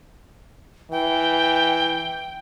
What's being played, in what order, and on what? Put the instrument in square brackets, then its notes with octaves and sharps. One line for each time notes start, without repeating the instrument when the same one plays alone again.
[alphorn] E3 [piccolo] G5